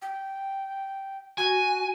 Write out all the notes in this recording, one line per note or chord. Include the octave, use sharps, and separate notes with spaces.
G5
F#4 G#5